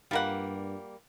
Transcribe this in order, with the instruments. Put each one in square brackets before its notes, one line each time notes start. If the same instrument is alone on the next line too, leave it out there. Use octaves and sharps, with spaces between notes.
[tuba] G2 [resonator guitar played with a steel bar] G3 A#3 [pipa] F4 A#4 F#5